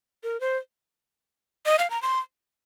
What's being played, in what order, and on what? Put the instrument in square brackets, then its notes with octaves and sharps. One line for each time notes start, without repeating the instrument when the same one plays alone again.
[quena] A#4
C5
D#5
F5
A#5
C6